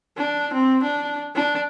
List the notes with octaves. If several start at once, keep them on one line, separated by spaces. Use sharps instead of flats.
D4
C4
D4
D4